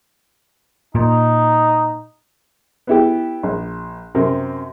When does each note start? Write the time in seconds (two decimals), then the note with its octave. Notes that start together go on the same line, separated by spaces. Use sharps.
0.95 A#2 D#4
2.87 B3 E4 G4
3.43 A#1
4.15 F#2 C3 A#4